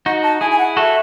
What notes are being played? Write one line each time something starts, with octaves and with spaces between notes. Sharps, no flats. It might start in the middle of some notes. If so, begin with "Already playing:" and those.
D#4 F#4 F#5
A5
E4 G#4 G#5
G#5
F#5
F#4 A4 E5